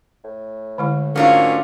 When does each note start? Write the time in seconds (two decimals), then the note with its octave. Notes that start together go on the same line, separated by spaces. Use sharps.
0.24 A2
0.78 D3 G#3 E4
1.16 G#2 F#3 A3 A#3 C#4 D4 F4